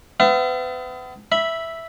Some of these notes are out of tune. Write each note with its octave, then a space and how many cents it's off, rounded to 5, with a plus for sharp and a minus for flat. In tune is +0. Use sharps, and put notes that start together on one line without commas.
B3 +40 E5 +45
E5 +0 B5 -10